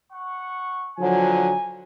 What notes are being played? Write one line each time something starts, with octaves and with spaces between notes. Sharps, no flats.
F#5 C#6
D3 F3 F#3 G#5